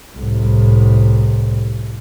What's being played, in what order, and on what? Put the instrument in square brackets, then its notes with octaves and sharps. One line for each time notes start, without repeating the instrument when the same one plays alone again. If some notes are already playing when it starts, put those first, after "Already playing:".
[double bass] C2 A2